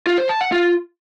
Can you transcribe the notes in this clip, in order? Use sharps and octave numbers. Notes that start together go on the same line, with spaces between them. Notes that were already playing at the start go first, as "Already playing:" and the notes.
F4
C5
A5
F#5
F4